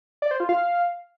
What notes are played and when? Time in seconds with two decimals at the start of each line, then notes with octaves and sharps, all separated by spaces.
0.22 D5
0.31 C5
0.40 F4
0.49 F5